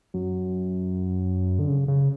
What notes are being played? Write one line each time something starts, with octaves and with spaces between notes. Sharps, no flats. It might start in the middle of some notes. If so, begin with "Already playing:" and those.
F#2
D3
C#3
C#3